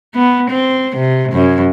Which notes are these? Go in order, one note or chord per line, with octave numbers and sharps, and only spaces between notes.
B3
C4
C3
F#2